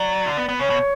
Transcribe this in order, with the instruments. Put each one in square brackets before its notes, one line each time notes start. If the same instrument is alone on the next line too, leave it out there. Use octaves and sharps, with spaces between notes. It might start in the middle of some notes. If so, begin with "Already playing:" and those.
Already playing: [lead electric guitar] F#3 [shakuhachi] D5
[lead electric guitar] D3
B3
B3
[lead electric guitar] C#3 [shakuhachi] C#5
[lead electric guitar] B2